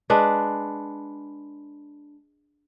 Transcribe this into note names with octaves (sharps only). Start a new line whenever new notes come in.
G#3 D4 B4